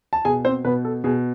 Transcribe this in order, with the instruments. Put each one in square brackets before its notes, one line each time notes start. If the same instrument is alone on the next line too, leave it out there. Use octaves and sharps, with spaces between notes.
[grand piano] A5
B2 G#4 G#5
C4 C5
B2 B3 B4
A4
B2 G#4